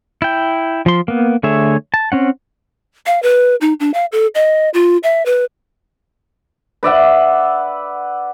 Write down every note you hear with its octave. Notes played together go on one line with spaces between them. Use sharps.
E4 G5
F3 C6
A#3 B3
D3 A3 G#4 C#5 E5
A5
C4 C#4 F#5
F5
B4
D#4
D4
F5
A4
D#5
F4
E5
B4
B4 D5 E5 F#5